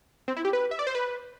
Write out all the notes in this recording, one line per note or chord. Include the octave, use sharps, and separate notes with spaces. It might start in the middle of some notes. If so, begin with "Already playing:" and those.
C4
E4
G4
B4
E5
D5
C5
B4